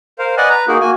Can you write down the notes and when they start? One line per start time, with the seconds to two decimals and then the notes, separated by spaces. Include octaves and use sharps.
0.19 A#4 C5 F5
0.37 B4 D5 D#5 F#5 G#5
0.50 B4 A#5
0.68 A#3 D#4 F#4 G#4 A#4
0.81 A#3 F#4 G#5